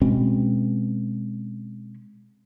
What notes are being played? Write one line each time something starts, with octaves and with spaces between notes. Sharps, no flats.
B2 G#3 C4 C#4